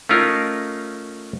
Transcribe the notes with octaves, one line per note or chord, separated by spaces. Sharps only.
A3 C#4 D#4 F4 A#4